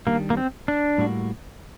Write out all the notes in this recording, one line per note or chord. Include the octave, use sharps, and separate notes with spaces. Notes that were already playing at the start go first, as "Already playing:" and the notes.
D#3 G3 A#3 D4
A#3
C4
D4
A2 G3 A#3 F#4